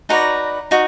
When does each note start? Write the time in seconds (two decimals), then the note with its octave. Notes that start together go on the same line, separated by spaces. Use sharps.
0.09 D#4 F#4 B4 D5 A#5
0.71 D#4 F#4